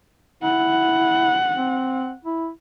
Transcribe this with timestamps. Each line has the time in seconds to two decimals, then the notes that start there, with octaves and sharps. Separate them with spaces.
0.43 E4 F#5
1.54 C4
2.25 E4